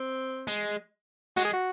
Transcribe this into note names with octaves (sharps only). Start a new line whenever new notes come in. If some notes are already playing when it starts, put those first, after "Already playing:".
Already playing: C4
G#3
G#3 F#4
G#4
F#4